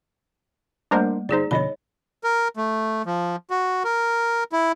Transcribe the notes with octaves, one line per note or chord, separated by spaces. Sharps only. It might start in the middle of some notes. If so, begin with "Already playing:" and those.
G3 A3 A#3 D4 A#4 C5
G1 D#4 G#4 C5 D5
F2 B2 D3 C#5 D#5 B5
A#4
A3
F3
F#4
A#4
E4